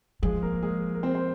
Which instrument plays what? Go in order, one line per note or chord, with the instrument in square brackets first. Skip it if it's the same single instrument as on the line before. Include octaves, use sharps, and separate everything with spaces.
[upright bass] F3 [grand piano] G#3 G#4
[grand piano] A#3 A#4
G#3 G#4
A#4
C4 C5
C5